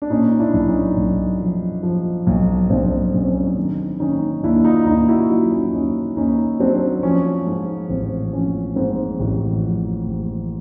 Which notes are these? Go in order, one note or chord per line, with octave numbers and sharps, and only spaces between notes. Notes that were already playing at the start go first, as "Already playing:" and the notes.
D4
A#2 C#4 D#4
D4 E4
B1
C#4 D#4
B1
F3
F3
B1
B1 C4 D4
B1 C#4
C4
C#4
D#4
D#3 C4 D4
D#3 C#4 D#4
D#2 D4 E4
D#4 F4
D#2 D#4 F4
E4 F#4
F#3 D#4 F4
C#4 D#4
D#2 C#4 D#4
D#2 C#4 D#4
F#3 C4 D4
F3 C#4
G#2
A1 C4
F3 C#4
G#2 C4
A1
F3
A1